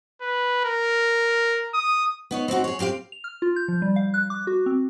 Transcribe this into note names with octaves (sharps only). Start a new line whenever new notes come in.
B4
A#4
D#6
B3 D#4 C#5
C4 C#4 D#4 F#4
G#4 C#5
A2 C4 G4 F5
F7
F6
F4
G6
F3
G3
F5
F#6
D6
F#4
C4